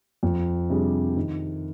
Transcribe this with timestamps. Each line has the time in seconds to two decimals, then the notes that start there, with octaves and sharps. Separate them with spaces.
0.23 F2
0.70 C3 G3 D4 G#4
1.16 D#3